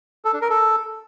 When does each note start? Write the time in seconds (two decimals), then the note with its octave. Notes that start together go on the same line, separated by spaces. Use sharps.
0.25 A4
0.33 D4
0.42 A#4
0.50 A4